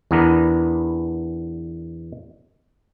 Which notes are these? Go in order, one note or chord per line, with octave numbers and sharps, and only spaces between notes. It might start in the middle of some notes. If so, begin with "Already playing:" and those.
E2 E3 B3 D4 A#4